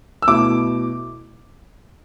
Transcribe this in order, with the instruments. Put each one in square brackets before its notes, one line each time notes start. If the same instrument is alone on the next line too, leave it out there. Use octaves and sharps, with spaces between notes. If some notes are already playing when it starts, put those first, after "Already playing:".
[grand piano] E6
B2 A3 E4 D6